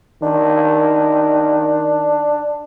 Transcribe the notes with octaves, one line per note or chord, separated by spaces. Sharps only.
D#3 D4